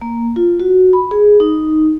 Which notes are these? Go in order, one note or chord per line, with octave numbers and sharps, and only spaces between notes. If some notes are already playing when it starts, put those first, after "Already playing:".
A#3
F4
F#4
B5
G#4
D#4